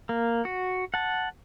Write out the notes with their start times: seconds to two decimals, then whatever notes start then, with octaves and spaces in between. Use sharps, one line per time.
0.09 A#3
0.45 F#4
0.94 F#5 A5